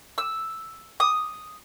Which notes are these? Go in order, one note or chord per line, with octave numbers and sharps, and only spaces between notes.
E6
D#6